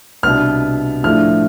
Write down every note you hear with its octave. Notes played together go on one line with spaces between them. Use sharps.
C2 B2 B3 D4 F6
A2 F3 A3 D4 F6